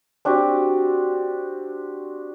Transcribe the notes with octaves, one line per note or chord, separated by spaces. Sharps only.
C4 D4 F#4 G4